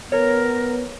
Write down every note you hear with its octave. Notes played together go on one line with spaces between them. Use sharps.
B3 A#4 C#5